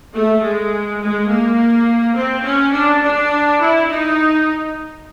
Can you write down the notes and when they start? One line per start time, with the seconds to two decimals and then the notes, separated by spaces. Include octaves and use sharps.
0.14 A3
0.43 G#3
1.01 G#3
1.29 A#3
2.17 C4
2.46 C#4
2.74 D4
3.03 D4
3.60 E4
3.90 D#4